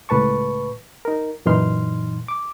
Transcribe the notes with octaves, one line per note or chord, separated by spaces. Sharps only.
C#2 A2 B4 A5 C#6
D#4 A#4
F#2 A#2 E3 D#4 C6 F6
D6